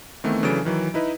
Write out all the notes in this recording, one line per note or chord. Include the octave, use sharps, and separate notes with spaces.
D#3 E3 A3 B3 C4
C#3 E3 F#3 D4 A4 D7
D#3 E3 F#3
D#4 E4 B4 D#5